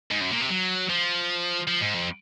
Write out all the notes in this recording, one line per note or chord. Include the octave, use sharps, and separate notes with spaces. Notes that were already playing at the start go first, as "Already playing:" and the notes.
G#2
F#2
A#2
C3
F#3
F3
F3
G#2
F2